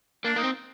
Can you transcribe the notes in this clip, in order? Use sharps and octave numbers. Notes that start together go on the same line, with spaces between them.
A#3 D4
A#3 D#4
C4